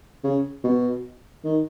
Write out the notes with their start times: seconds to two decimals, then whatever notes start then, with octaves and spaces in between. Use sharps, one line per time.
0.24 C#3
0.64 B2
1.44 D#3